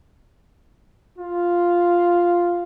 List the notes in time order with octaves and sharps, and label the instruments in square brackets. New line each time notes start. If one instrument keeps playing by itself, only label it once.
[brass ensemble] F4